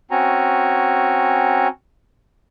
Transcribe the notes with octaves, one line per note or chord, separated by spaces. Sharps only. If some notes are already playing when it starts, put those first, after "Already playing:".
C4 C#4 F#4 G#5 A#5